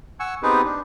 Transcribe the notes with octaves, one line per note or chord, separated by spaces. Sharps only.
F#5 G#5 C#6 E6
B3 C4 D#4 G4 G#4 B4
D4